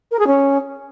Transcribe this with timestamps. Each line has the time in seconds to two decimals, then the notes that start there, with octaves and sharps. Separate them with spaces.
0.11 A#4
0.19 G#4
0.27 C#4